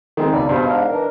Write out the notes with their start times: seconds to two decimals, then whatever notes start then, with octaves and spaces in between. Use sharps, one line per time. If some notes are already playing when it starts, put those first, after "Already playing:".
0.17 D#3 G#3 C4
0.33 C#2 B2 D#4 D5
0.49 G2 B2 C5
0.66 G#2 D4 D#4 F5
0.88 E3 D4 A#4